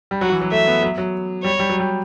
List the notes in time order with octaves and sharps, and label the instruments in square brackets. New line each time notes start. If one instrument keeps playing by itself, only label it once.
[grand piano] G3
[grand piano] F#3 [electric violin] F#4
[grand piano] E3
F#3
[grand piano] A3 [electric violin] E5
[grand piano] B3
F#3
F#3
[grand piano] G3 [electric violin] C#5
[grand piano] G3
F#3
G3